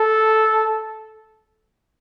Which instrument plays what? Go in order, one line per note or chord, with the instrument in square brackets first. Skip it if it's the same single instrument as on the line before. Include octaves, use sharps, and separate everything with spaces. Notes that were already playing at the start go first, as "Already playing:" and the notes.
Already playing: [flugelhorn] A4